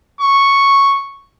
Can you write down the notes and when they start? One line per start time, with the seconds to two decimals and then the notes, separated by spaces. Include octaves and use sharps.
0.21 C#6